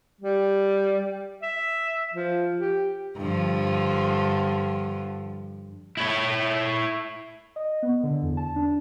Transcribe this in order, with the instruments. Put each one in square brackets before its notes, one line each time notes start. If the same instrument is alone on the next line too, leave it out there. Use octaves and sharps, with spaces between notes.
[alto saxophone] G3
E5
F3
G4
[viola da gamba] G2 D3 F3
[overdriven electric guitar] E4 C#5
[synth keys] D#5
B3
D3
E2
A5
D4